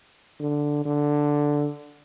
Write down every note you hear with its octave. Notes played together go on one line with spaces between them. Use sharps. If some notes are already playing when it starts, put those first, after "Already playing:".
D3
D3